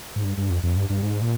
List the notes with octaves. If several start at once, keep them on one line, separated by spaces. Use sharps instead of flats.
G#2
G2
G2
F2
F2
G2
G2
G#2
A#2